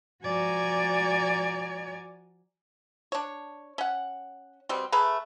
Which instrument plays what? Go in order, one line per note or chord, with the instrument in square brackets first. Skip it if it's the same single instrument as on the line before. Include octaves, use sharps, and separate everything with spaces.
[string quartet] F3 F#4 D5 G#5 A#5 G#6
[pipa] D4 C#5
C#4 F#5
B2 G3 C4
A3 G#4 B4 A#5